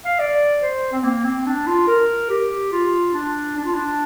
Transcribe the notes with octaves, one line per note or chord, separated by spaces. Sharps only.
F5
D5
C5
C4
A#3
C4
D4
F4
A#4
G4
F4
D4
D4
F4
D4